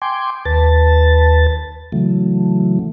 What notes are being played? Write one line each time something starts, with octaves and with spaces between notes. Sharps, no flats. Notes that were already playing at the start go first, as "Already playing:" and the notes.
G5 G#5 C6 D6
D#2 B4 A5 A6
C#3 E3 F#3 A3